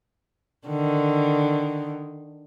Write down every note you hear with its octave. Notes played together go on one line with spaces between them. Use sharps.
D3 D#3